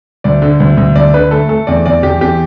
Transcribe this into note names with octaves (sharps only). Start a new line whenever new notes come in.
D2 D5
D3
D2
D2
D2 D5
D3 B4
A3 A4
A3 A4
E2 D5
E2 D5
E2 G4
E2 G4